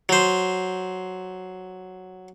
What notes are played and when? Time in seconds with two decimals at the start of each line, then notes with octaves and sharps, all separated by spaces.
0.09 F#3 C5